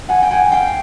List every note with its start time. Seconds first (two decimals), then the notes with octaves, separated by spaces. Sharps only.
0.09 F#5 G#5
0.22 G5
0.30 F#5 G#5
0.52 F5 G5